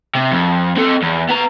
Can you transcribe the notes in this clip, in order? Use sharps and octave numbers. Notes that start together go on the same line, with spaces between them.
C3
F2
C4 A4
E2
B3 A#5